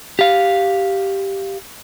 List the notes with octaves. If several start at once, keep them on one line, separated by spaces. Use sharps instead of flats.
G4 F5